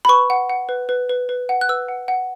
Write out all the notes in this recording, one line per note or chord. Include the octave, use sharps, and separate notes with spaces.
B5
B4 C#6
F#5
F#5
B4
B4
B4
B4
F#5
F#6
B4 E6
F#5
F#5